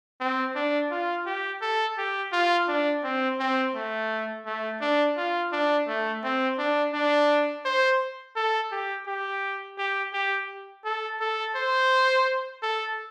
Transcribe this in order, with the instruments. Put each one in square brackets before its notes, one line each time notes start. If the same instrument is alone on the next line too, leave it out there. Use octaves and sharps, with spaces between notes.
[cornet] C4
D4
F4
G4
A4
G4
F4
D4
C4
C4
A3
A3
D4
F4
D4
A3
C4
D4
D4
C5
A4
G4
G4
G4
G4
A4
A4
C5
A4